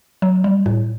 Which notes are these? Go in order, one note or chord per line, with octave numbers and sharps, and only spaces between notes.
F#3
G3
A2